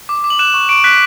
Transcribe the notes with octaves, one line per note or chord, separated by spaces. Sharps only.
D6
D6
F#7
F#6 E7
C#6
C#6 D7
F#6 B6